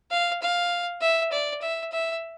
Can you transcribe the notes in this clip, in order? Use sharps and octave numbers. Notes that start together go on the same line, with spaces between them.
F5
F5
E5
D5
E5
E5